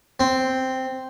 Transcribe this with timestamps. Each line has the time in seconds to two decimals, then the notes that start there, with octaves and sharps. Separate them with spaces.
0.20 C4